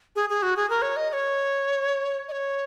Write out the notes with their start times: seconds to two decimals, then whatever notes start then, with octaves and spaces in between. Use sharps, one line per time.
0.16 G#4
0.30 G#4
0.43 F#4
0.57 G#4
0.70 A#4
0.82 C#5
0.97 D#5
1.10 D#5
1.13 C#5
2.28 D#5
2.32 C#5